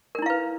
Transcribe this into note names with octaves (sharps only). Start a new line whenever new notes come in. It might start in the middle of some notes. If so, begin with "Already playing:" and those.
D4 E4 A#4 B4 F5